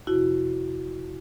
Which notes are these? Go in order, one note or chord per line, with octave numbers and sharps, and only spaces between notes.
F2 C3 F3 E4 F#4